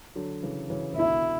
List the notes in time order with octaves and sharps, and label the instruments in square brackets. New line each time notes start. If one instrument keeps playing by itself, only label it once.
[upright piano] D3 F#3
C#3 E3
C#3 E3
E3
[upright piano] B2 D3 [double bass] E4